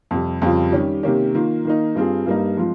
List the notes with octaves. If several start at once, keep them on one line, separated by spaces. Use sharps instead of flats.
F2 C3 G3
F2 C#3 G3 C4 F4
D#3 G3 C#4 G4
C3 D#3 A#3 C#4 G4
D#3 A#3 F4
D#3 A#3 D#4
G2 G3 C4 F4 G#4
G2 G3 A#3 D#4
F3 G#3 C4 F4